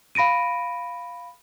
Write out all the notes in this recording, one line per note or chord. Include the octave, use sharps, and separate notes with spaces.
F5 B5 A#6 D7 D#7